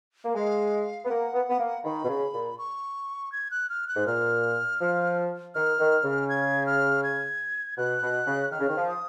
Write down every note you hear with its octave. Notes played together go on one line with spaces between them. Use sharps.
A#3
G#3 F5
B3
A#3 F#5
B3
B3
A#3
D#3 B5
B2
C#3
A#2
C#6
G#6
F#6
F6
F#6
G#2
A#2 F6
F3
D#3 F6
D#3
C#3
G#6
F6
G#6
B2 F#6
B2
C#3
D#3 F6
C#3
D#3
F3
D#6